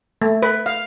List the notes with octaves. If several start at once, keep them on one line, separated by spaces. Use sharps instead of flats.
A3
B4
F5